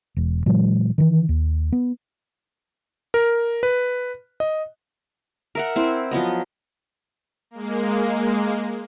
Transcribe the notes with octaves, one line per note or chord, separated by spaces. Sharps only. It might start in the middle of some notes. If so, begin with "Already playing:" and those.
E1
A#2 E3 F#3 G#3
D#3 E3
D#2
B3
A#4
B4
D#5
A#4 E5 F#5
C4 E4 C5
F3 F#3 B3 D#5
G#3 A#3